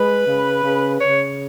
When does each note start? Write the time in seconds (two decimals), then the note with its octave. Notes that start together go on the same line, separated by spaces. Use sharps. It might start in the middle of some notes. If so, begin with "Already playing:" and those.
Already playing: G#3 B4
0.26 C#3
0.64 C#3
1.01 C#3 C#5